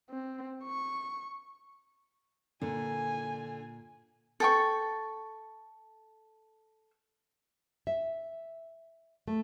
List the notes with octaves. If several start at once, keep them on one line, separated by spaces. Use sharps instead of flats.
C4
C#6
A#2 D3 G#5
A4 G5 C#6
E5
A3